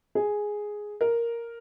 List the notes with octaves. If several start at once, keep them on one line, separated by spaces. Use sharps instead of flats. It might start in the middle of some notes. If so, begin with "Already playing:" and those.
G#4
A#4